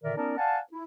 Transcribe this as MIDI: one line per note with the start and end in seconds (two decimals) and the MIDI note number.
0.03 0.15 46
0.03 0.15 50
0.03 0.15 51
0.03 0.15 70
0.03 0.15 74
0.03 0.15 76
0.17 0.33 59
0.17 0.33 61
0.17 0.33 63
0.17 0.33 70
0.17 0.33 74
0.17 0.33 81
0.37 0.59 74
0.37 0.59 77
0.37 0.59 78
0.37 0.59 80
0.37 0.59 81
0.72 0.82 64